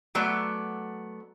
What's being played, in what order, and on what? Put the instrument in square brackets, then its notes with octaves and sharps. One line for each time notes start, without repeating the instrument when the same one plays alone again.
[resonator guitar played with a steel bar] F#3 A3 B3 D5